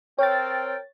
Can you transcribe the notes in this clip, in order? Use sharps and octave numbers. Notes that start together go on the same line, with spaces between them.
C4 A#4 C#5 G5 A6